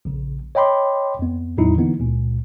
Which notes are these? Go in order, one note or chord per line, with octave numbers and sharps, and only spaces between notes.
A#1 C#3
C#5 D#5 G5 B5 C6 D6
F2 B3
E2 A2 F#3 D#4 E4
D3 E3 A#3 B3 D#4 E4
C#2 A#2